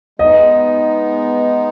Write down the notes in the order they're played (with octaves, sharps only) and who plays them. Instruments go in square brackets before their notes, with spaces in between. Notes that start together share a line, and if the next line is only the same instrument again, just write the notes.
[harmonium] G#3 B3 D#4 [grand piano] D#5